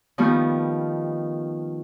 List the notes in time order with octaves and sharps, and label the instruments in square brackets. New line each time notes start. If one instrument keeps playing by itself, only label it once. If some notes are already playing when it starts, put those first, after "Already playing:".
[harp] D#3 F3 G3 A3 B3